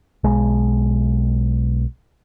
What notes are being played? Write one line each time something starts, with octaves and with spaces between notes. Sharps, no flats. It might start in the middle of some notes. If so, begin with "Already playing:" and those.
B1 G#3